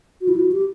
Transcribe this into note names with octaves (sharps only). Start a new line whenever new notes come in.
F#4
E4
F#4
G4